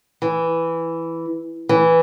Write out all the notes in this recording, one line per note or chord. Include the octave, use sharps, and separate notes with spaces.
E3
E3